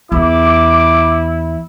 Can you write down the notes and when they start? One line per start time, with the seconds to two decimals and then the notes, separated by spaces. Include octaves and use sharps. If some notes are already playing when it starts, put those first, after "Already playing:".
0.12 E2 E4 D6